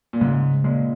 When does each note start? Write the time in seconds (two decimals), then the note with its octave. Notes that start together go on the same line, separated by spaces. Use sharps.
0.13 A#2
0.21 G#2 C#3
0.64 A#2 G#3